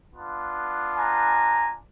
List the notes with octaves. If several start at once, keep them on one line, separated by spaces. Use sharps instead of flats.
B3 D4 F4
G#5 A#5